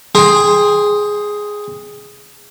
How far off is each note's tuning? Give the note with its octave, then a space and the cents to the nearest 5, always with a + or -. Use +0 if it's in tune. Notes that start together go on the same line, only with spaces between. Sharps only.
G#4 +0 G5 +30 C6 +0